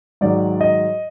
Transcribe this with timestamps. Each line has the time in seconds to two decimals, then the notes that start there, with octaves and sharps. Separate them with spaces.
0.21 G#2 D#3 F#3 D5
0.61 D#5